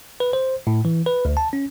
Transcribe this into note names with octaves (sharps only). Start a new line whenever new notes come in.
B4
C5
A2
E3
B4
D2
A5
C#4